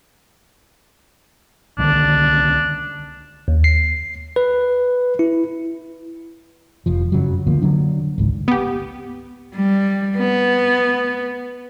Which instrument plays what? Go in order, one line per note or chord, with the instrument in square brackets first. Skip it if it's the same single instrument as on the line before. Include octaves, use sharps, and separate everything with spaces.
[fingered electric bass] C2 D3 D#3 [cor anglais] D4
[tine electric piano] D#2
C7
B4
E4
[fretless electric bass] F1 F2 F3
F#2 C#3 F#3
D2 D3 F3 A#3
D3 F#3 D4
G#1 C#2 G#2
[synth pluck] B3 G4
[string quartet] G3
B3